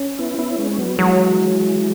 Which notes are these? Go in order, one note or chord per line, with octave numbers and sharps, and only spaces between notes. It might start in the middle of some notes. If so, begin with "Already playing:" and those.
Already playing: C#4
B3 E4
B3 E4
G#3 C#4
C#4
F#3 B3
E3 F#3 G#3